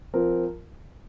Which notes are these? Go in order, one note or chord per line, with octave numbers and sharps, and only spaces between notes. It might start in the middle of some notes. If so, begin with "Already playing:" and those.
F3 C4 F4 A#4